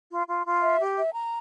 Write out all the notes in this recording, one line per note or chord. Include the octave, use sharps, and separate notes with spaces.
F4
F4
F4
E5
G4
E5
A#5